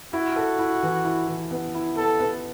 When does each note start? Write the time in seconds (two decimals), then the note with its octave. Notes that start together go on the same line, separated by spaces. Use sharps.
0.13 E4 F#4
0.36 A4
0.59 E4
0.83 E3
1.05 E4
1.28 E3
1.51 B3
1.75 E4
1.97 B3 A4
2.20 B3